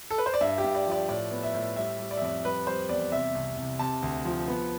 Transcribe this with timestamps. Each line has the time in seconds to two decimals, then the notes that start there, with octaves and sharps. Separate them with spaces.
0.10 A4
0.18 B4
0.26 C5
0.34 D5
0.41 G2 E5
0.58 G4
0.64 G2
0.75 D5
0.86 F3
0.92 D5
1.09 A2 D5
1.31 B3
1.43 E5
1.55 A2
1.76 G3 E5
1.99 G3
2.11 D5
2.17 E5
2.22 F2 D5
2.45 G3 B4
2.67 G3 C5
2.89 E2 D5
3.12 C3 E5
3.35 C2
3.57 C2
3.79 C3 A5
4.02 D2
4.25 F3
4.48 B3